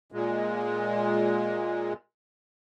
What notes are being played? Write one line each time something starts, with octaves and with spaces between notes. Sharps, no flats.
A#2 G#3